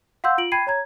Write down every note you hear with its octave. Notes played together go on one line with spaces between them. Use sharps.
F5 F#5 C6 E6 G6
F4 D7 F#7
G5 B5 G#6 C7 D#7
C#5 A#5 G#6